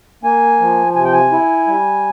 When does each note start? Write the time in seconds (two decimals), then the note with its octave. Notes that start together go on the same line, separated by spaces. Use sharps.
0.23 A#3 G#5
0.60 F3
0.96 C3 G#5
1.05 G5
1.13 G#5
1.32 E4
1.67 G3